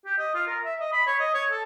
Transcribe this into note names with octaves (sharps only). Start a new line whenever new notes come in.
G4
D#5
F4
A#4
E5
D#5
B5
C#5
D#5
C#5
A4